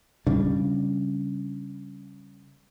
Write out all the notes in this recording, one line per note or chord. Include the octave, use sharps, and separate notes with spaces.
C#3 G3 D4